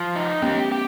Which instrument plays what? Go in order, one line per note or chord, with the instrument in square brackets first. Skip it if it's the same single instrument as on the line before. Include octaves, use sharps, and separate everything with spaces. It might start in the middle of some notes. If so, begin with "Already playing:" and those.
Already playing: [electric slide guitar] F3
D#4
[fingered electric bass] B3 C#4 [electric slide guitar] G4
[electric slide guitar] G4